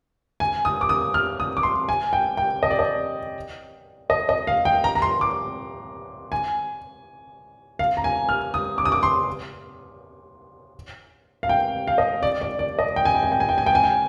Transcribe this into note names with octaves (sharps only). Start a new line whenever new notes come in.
G#5
D#6
D6
D#6
F6
D#6
D6
C6
G#5
G5
G5
D#5
D5
D#5
D#5
D#5
F5
G5
A#5
A#5
C6
D6
G#5
F5
A#5
G#5
F6
D#6
D6
D#6
D6
C6
F5
G5
F5
D#5
D5
D5
D5
D#5
G5
G#5
G5
G#5
G5
G#5
G5
G#5
G5
G#5
G5